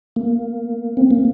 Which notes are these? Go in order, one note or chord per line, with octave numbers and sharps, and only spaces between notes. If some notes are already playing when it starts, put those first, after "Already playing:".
A#3
C4
A#3